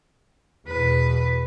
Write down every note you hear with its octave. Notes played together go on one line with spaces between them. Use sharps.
E2 B2 B4